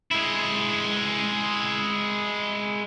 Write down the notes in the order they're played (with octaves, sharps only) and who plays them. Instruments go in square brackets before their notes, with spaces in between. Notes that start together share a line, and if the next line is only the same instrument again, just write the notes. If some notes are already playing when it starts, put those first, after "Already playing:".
[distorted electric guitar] G#3 E4